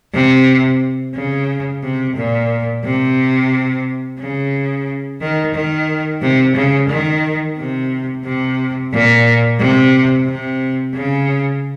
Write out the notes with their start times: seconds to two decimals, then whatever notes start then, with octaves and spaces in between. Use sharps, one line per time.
0.14 C3
1.15 C#3
1.83 C3
2.16 A#2
2.85 C3
4.20 C#3
5.21 D#3
5.54 D#3
6.22 C3
6.56 C#3
6.89 D#3
7.58 C3
8.25 C3
8.93 A#2
9.60 C3
10.27 C3
10.95 C#3